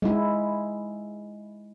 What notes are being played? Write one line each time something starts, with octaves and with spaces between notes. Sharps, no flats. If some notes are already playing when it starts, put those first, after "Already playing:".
G#3 E4